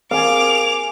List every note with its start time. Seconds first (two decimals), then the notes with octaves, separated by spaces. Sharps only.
0.11 C4 G#4 A#4 F5 G#5 D6 F7